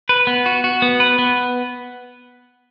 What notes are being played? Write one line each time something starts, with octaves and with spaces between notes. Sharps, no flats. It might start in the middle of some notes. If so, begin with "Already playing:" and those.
B4
B3
F#4
F#4
B3
B4
B3